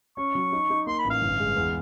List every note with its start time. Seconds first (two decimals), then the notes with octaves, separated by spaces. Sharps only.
0.17 C#4 C#6
0.35 F#3
0.52 D#4
0.70 D#4
0.87 A#3 C6
0.99 B5
1.04 A1
1.11 F5
1.21 G1
1.40 G#3
1.57 E2